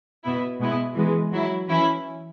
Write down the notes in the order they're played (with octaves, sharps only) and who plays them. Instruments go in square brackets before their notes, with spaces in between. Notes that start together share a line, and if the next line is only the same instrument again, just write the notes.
[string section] B2 B3 E4
B2 G#3 B3 E4
E3 G#3 B3
F#3 E4
E3 C#4 E4